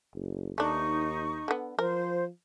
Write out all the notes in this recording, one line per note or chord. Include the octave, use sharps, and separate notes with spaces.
F#1
D#2 A3 D4 D#4 C#6
D3 B3
F3 A#4 C5